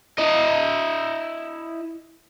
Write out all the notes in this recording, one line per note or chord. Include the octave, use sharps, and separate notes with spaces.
E4 D#5